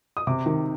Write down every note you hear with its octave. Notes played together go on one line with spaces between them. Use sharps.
D#6
C3 D6
D#3